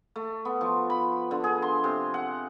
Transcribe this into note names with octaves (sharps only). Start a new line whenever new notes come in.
A3
B3
F3
B5
D3
G#4
C6
C3
F#5